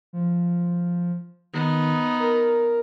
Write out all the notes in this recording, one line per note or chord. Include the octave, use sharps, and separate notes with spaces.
F3
D#3 B3 D#4
A#4